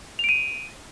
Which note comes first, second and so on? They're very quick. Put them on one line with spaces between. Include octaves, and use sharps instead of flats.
F7 D7 D#7